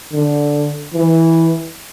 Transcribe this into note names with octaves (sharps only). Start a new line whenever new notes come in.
D3
E3